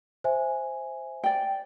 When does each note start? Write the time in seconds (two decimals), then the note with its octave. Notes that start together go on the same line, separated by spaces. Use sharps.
0.24 C5 E5 G#5
1.24 D5 G5